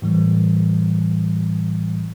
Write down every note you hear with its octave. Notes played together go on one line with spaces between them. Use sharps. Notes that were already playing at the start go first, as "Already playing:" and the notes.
A2 E3 G3